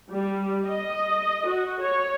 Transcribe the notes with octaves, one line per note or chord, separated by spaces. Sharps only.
G3
D#5
F#4
C#5